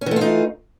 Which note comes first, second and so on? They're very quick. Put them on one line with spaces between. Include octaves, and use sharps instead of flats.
C#4 E3 A3 F4 D#4